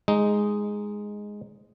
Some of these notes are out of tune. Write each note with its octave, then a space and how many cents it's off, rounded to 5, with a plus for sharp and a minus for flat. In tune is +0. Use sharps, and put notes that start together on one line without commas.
G#3 +0 D#4 +0